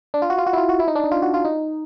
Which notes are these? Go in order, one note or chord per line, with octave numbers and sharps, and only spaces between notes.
D4
F4
F#4
F4
F#4
E4
F4
F#4
E4
D#4
D4
D#4
F4
F#4
F4
D#4